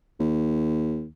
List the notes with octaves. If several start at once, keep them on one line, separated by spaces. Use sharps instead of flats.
D#2